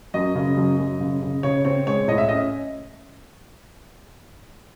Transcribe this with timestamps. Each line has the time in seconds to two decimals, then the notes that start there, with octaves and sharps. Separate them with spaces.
0.14 F#2 D#5
0.35 C#3
0.57 F#2
0.79 F#2
1.00 C#3
1.22 C#3
1.43 C#3 C#5
1.65 C4 C#5
1.87 G#3 C#5
2.08 A2 D#5
2.18 E5
2.29 C#4 D#5